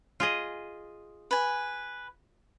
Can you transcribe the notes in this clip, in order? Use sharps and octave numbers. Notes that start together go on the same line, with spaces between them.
F4 G#4 D#5
B4 G#5